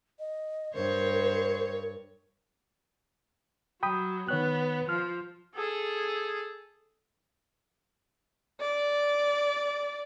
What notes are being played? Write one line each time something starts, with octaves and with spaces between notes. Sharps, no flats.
D#5
G2 A#4 C5 C#5
F#3 G5 B5 D#6
D#3 B3 C#5 F#6
F3 F6
G#4 A4
D5